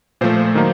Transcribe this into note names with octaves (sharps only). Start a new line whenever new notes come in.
A#2 F3 A3 C5
D#3 F#3 A#3 D#4